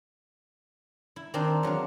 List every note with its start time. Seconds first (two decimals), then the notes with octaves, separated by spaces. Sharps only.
1.16 E4
1.34 D#3 C4 D4 A#4 C6
1.63 E2 F#3 D4 F5